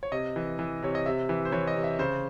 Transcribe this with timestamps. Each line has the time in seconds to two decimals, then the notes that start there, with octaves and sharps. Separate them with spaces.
0.03 C#5
0.12 C3 D#5
0.36 E3
0.59 E3
0.83 C3 C#5
0.95 D#5
1.06 C3 E5
1.29 E3
1.45 C5
1.52 E3 C#5
1.67 D#5
1.76 C3
1.84 E5
1.99 C#3 C5